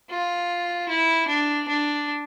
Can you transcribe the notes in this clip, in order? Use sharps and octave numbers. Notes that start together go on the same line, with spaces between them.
F4
E4
D4
D4